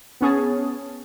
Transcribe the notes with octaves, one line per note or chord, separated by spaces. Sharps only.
B3 C#4 G#4 A5